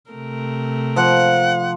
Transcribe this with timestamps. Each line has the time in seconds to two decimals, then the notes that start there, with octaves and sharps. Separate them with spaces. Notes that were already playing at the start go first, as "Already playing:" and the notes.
0.11 C3 A3 A#4
0.96 F3 F#5